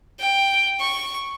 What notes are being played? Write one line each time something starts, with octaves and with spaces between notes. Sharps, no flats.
G5
C#6